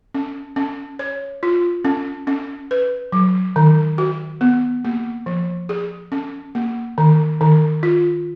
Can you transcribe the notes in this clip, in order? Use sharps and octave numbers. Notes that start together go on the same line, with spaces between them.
C#4
C#4
C#5
F4
C#4
C#4
B4
F#3
D#3
F#4
B3
A#3
F3
G#4
C#4
A#3
D#3
D#3
F4